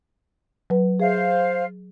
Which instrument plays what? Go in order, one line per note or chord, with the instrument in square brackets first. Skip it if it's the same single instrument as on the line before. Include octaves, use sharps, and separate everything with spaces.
[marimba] F#3 B4
[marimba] G#4 E5 [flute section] C5 F5